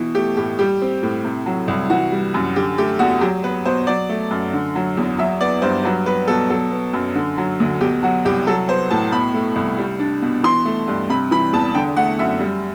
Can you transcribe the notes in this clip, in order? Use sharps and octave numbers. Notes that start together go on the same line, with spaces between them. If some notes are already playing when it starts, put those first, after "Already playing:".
Already playing: B2 E3
A3 G4
A2 G4
G3 G4
C4
A2
C3
F#3
C2
E3 F#4
G3
F#2
D3 G4
A3 G4
E2 F#4
F#3 G4
B3 B4
B2 C5
F#3 D5
A3
F#2
D3
F#3
E2
F#3 E5
B3 D5
G2 C5
F#3 B4
B3 B4
B2 A4
F#3 A4
B3
F#2
D3
F#3
D2
B2 G4
F#3 F#4
C2 G4
F#3 A4
B3 C5
A2 A5
B2 B5
A3
C2
G3
D4
B2
E3 C6
A3
G2
C3 B5
E3 B5
E2 A5
D3 G5
A3 F#5
F#2 E5
G3